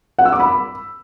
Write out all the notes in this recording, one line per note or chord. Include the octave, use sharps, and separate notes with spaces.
F#5
E6
D6
B5